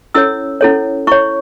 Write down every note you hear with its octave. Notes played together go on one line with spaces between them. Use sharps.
C#4 E4 A4 C#5 E6
C#4 E4 A4 C#5
E4 C#5 C#6